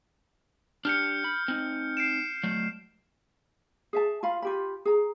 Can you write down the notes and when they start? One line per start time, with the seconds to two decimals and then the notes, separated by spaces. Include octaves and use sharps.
0.85 D4 G4 F6 G6 C#7
1.24 B5
1.48 C4 D#4
1.97 C7 D7 E7
2.43 F#3 A3
3.93 G#4 E5 A5
4.23 F4 F5 B5
4.42 F4 G4 B5
4.85 G#4 A#5